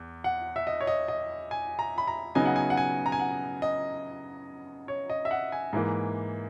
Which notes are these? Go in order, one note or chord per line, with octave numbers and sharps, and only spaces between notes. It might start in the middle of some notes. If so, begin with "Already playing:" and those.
Already playing: E2
F#5
E5
D#5
C#5
D#5
D#5
G#5
A#5
B5
A#5
C#3 F#3 B3 D#4 G#5
F#5
G#5
F#5
G#5
A#5
G#5
F#5
D#5
C#5
D#5
E5
F#5
G#5
G#2 E3 A#3